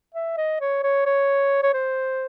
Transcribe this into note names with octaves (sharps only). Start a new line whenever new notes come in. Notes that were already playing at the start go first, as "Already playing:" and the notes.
E5
D#5
C#5
C#5
C#5
C#5
C5